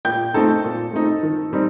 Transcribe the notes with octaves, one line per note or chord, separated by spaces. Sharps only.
A#2 G5 G6
A3 C4 D#4 A4 A5
A#2
A3 C4 D#4
D#3
G3 C4 D#4